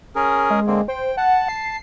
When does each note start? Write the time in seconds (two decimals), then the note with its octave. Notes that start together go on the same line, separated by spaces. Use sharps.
0.16 C#4 G#4 A#4
0.50 G#3
0.67 D3 A#3 C4
0.88 C5 G5
1.17 F#5 A5
1.49 C7